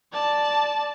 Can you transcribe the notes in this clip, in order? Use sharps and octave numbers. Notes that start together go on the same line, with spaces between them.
D5 A5